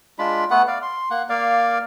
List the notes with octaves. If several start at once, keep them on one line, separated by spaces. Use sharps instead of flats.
G#3 D4 F4 B5
A3 B3 F#5
D5 F5
C6
A#3 F#5
A#3 D5 F5